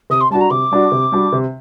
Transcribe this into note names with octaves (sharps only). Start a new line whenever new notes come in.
C3 D#6
C6
G3 D4 F#4 A5
A#5
C3 D6
G3 D4 F#4
C3
G3 D4 F#4
C3